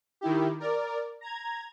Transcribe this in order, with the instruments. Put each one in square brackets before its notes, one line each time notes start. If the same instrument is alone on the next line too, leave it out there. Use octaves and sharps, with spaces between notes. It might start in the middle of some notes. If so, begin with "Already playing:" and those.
[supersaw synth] D#3 E4 G4
A#4 D5
A#5 G#6